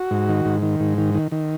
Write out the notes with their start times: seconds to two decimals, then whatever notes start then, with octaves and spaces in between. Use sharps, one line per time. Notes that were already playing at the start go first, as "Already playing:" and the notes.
Already playing: F#4
0.11 G#2
0.29 D#3
0.45 G#2
0.62 D#3
0.80 G#2
0.98 D#3
1.15 D#3
1.32 D#3